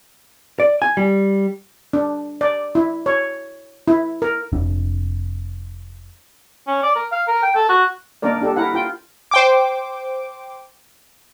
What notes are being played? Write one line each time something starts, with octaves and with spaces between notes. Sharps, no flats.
D5
G#5
G3
D4
D5
E4
C#5
E4
A#4
F1 F2 D4
C#4
D5
A#4
F5
A#4
G5
A4
F#4
A#3 D4 D#4 A#4 D5
D4 G4 A4
E4 A#4 F#5
F4 G5
C5 G5 D6